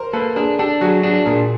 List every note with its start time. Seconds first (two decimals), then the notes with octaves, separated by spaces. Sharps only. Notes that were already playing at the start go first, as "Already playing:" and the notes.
Already playing: A#4 C5
0.13 A#3 A4 B4
0.36 D4 G#4 A#4
0.59 D4 G4 A4
0.81 F#3 F#4 G#4
1.03 D4 F#4 G#4
1.26 A#2 G#4 A#4